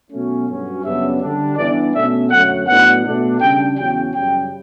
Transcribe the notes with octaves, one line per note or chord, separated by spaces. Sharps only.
B2 F#3 A3 C#4
G2 F#3 C#4
F#2 C#3 G3 B3 D4 E5
D3 G3 D4
G2 E3 B3 D4 D5
B2 A3 C#4 E5
F#2 D3 F#3 A3 F#5
A2 F#3 B3 D4 F#5
B2 A3 D4
C#3 G3 D4 G5
E2 C#3 F#3 C#4 G5
F#2 C#3 G3 G5